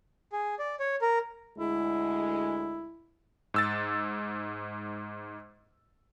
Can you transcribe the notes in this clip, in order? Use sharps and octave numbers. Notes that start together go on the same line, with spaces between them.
G#4
D5
C#5
A#4
D2 G#3 E4
G#2 E6 A6